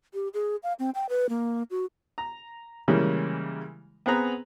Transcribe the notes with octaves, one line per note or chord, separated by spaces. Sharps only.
G4
G#4
F5
C4
G5
B4
A#3
F#4
A#5
C#3 E3 G3 G#3 A#3
B3 C4 G#4 B4 A#5